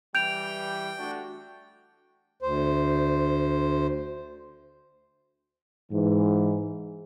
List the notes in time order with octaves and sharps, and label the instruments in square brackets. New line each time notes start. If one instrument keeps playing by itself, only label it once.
[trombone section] E3 G3 [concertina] G5 [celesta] G6 D7 F7
[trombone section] A3 D4 F#4
[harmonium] D2 C5
[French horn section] G#2 E3